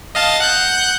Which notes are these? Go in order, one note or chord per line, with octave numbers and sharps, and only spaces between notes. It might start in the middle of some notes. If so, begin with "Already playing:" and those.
D#5 F5 A5
F#5 F#6 G6